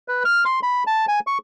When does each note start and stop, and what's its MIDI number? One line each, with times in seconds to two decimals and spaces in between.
0.08 0.23 71
0.25 0.44 89
0.45 0.60 84
0.63 0.83 83
0.87 1.05 81
1.08 1.20 80
1.27 1.38 85